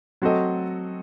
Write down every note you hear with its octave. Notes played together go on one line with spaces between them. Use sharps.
F#3 C4 F#4 A4 D#5